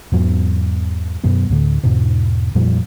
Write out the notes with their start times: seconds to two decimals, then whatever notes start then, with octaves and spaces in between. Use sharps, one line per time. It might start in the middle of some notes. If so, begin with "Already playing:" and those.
0.12 E2 G#2 F#3 B3
1.24 F#2 B2 F#3 B3
1.49 D2 A2 D3
1.83 E2 G#2 B2
2.55 F2 A#2 F3 G3